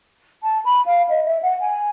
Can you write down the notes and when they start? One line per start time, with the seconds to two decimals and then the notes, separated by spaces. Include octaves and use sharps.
0.43 A5
0.65 B5
0.86 F5
1.09 D#5
1.26 E5
1.43 F#5
1.60 G#5